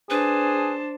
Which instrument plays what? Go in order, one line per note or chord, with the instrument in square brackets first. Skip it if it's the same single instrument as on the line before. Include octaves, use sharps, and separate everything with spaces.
[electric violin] D4 [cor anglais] G#4 [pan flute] B4 [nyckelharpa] C5 A5